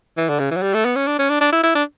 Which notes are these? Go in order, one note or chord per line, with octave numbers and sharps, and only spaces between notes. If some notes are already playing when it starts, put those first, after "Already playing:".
E3
D3
C#3
E3
F#3
G3
A3
B3
C#4
D4
C#4
D4
D4
E4
E4
D4